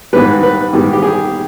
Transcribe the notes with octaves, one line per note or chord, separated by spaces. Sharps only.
G#2 D#3 G3 B4
B4
G#2 D#3 G3
G4
G#4